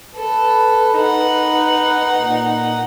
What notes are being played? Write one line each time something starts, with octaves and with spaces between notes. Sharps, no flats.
A4 B4
D#4 F#5
A#2